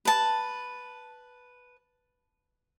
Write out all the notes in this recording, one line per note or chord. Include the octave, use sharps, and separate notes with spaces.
B4 A5